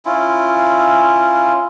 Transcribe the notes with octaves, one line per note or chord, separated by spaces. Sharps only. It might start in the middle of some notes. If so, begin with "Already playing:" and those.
C#4 E4 F4